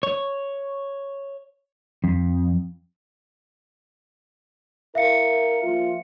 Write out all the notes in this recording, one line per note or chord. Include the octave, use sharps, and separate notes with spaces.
C#5
F2
E4 A#4 E5 F5 C#7
F3 A#3 F4